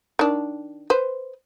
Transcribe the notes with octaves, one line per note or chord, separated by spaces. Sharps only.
D#3 D4
B4 C5